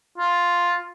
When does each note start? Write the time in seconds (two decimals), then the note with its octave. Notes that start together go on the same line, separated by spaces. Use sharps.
0.18 F4